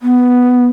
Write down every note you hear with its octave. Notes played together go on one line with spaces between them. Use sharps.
B3